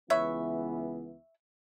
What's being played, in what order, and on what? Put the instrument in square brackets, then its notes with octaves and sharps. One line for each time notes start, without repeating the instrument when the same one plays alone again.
[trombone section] C#2 E3 B3 [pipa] B4 C#5 E5